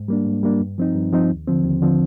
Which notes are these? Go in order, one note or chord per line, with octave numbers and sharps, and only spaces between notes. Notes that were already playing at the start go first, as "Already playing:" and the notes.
Already playing: G#2
G3 A#3 D4
G#2
G3 A#3 D4
G2
F3 C4 D#4
G2
F3 C4 D#4
D#2
D3 F3 C4
D#2
D3 F3 C4